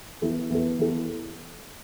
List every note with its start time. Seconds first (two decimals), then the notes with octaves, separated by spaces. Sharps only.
0.21 E3 B3 E4 A4
0.50 E3 B3 E4 A4
0.79 E3 B3 E4 A4